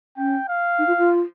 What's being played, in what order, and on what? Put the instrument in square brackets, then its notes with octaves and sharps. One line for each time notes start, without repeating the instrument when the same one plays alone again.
[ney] C#4 [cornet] G5
[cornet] F5
[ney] D#4
F4
F4